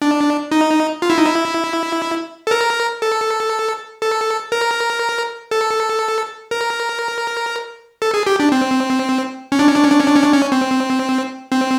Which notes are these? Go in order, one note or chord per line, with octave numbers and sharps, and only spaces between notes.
D4
D#4
F4
E4
D#4
E4
A4
A#4
A4
A4
A#4
A4
A#4
A4
G#4
G4
D4
C4
C#4
D4
C#4
D4
C#4
D4
C#4
D4
C#4
D4
C#4
C4
C4